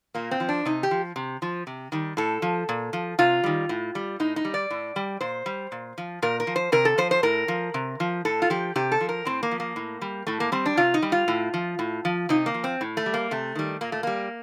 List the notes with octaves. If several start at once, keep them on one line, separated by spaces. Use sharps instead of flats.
A#2 A#3
C4
F3
D4
C3 D#4
G4
F3
C3
F3
C3
D#3 G3
A2 A4
F3
A#2
F3
C3 F4
D#3 G3
A2
G3
A2 D#4
D#4
G3
D5
A2
G3
A#2 C5
G3
A#2
F3
A#2 A#4
A#4
F3
C5
C3 A#4
A4
F3 C5
C5
A2 A#4
F3
C3
F3
A2 A4
F4
F3 G4
C3 G4
A4
F3
A#4
A2 C4
A#3
F3
A#3
A2
G3
A2 A3
A#3
G3 C4
D4
C3 F4
D#4
G3
F4
A2
F3
A2
F3
C3 D#4
A#3
F3
C4
A2
A3
G3
A#3
C3 A3
D#3 G3
A#2 A#3
A3
G3 A#3